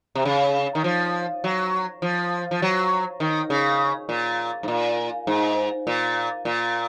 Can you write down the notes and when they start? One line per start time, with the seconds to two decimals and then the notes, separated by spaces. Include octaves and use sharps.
0.15 C3
0.25 C#3
0.75 D#3
0.84 F3
1.44 F#3
2.02 F3
2.51 F3
2.62 F#3
3.20 D#3
3.50 C#3
4.09 A#2
4.63 G#2
4.68 A#2
5.27 G#2
5.87 A#2
6.45 A#2